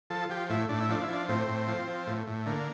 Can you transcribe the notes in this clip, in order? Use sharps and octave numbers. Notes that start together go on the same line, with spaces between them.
F3 A4
F3 G4
A2 E4
A2 D4
E4
F3 D4
E4
F3 D4
A2 C4
A2
F3
F3
A2
A2
D3 A#3